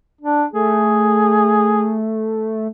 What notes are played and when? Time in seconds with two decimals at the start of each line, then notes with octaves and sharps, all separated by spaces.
0.21 D4
0.53 A3 G#4